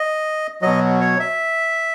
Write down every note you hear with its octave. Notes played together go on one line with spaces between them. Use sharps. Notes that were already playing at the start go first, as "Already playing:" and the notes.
Already playing: D#5
B2 F#3 D#5
C#5
E5